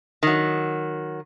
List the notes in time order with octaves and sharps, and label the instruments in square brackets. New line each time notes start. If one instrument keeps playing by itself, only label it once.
[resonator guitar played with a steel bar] D#3 F#3